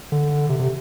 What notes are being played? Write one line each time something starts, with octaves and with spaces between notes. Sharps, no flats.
D3
C3
C3